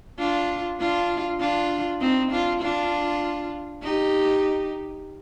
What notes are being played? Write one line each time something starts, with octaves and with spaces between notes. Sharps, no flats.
D4 F4
D4 F4
D4 F4
C4 D#4
D4 F4
D4 F4
D#4 G4